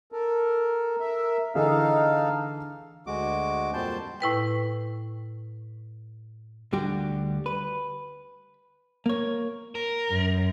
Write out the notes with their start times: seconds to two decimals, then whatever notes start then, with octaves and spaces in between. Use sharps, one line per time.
0.12 A4 A#4
1.00 A#4 E5
1.55 D3 E3 D#4 G#4 A4 F5
3.07 D2 G#3 F#4 D6
3.74 F2 A#2 G3 C5 A5 G6
4.20 A2 E4 B4 G5
6.73 D2 D3 G3 F#4 G4
7.46 B4
9.06 A#3 C#5
9.75 A#4
10.10 F#2